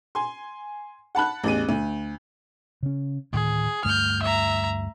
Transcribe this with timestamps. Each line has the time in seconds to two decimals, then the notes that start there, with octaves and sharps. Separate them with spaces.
0.15 G#5 C6
1.15 F#5 A5 B5 F#6
1.44 A1 E2 D#7
1.69 D2
2.83 C#3 C#4
3.33 D2 A2 D#3 G#4
3.85 D2 G2 A3 F6 G6
4.23 E5 A#5